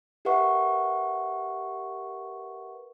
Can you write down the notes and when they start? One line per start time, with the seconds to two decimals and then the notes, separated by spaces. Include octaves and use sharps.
0.25 G4 A#4 B4 E5 F#5 C#6